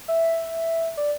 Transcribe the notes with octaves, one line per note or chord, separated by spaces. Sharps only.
E5
D5